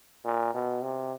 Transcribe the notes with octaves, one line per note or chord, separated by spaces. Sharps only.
A#2
B2
C3